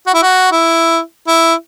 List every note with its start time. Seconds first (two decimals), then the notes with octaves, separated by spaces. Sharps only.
0.07 F#4
0.14 E4
0.23 F#4
0.52 E4
1.27 E4